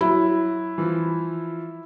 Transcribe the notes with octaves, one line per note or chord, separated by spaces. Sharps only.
F#3 E4
E3 F3